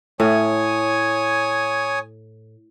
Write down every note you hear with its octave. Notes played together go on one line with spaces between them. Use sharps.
A2 C#5 G#5 D#6